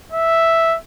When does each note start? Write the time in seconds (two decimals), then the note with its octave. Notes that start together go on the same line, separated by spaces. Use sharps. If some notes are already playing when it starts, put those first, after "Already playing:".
0.12 E5